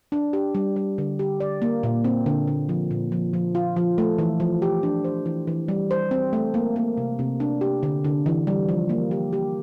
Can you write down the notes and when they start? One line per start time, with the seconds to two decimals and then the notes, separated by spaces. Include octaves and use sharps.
0.12 D4
0.33 G4
0.55 G3
0.76 G3
0.98 D3
1.19 G4
1.40 D5
1.62 A#3
1.83 A#2
2.04 C4
2.26 D3
2.47 D3
2.69 F3
2.91 A#2
3.12 F3
3.33 F3
3.55 F4
3.76 F3
3.98 A3
4.18 E3
4.40 F3
4.62 G4
4.83 D4
5.04 C5
5.26 E3
5.47 E3
5.68 G3
5.91 C5
6.11 C4
6.33 A3
6.54 A#3
6.76 A#3
6.97 C3
7.19 C3
7.40 D4
7.61 G4
7.83 D3
8.04 D3
8.26 E3
8.47 G3
8.69 F3
8.89 A#3
9.11 G4
9.33 G4